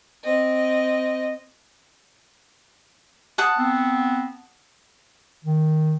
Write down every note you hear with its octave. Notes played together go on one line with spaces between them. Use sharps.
C4 D#5
F#5 A5 D#6
B3 C4
D#3